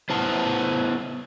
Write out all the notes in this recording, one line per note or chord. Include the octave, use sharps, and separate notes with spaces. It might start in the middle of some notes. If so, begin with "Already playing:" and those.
B3 E4 B4 C5 F#5 A5